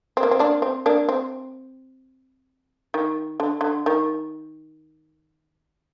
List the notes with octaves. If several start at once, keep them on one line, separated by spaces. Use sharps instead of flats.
C4
A#3
C4
A#3 D4
C4
A#3 D4
C4
D#3
D3
D3
D#3